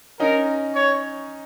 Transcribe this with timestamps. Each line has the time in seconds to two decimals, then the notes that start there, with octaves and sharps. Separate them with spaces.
0.20 C#4 D#4 A#4
0.75 C#5